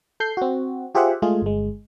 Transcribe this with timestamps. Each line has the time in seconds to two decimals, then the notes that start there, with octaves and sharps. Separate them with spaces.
0.20 A4 G6 C7
0.37 C4 F#4
0.95 F4 G4 G#4 C5 E5 F#5
1.22 G#3 A3 F4 G#4
1.42 G1 G#3